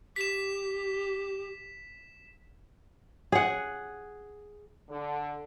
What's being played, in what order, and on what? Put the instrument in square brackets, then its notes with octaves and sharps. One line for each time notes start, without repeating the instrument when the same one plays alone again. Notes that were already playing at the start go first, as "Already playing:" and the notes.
[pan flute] G4 [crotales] B6 E7
[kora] G#4 F#5
[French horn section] D3